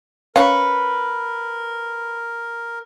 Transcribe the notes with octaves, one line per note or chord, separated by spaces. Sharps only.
C#4 A#4 B4 F5 C#6